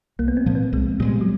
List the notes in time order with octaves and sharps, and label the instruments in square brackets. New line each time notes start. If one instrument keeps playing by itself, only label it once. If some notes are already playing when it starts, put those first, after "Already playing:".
[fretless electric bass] C2 [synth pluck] A#3
[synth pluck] B3
C4
[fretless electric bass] A#2 F3 G#3
[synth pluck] B3
[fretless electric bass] C2 [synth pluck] G#3
[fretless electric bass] A#2 F3 G#3 [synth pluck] G3
[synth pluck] F#3